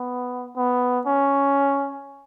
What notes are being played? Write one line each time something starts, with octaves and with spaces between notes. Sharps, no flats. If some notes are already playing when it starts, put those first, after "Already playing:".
Already playing: B3
B3
C#4